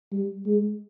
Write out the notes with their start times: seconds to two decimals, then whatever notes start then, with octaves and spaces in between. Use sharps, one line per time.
0.12 G3
0.46 G#3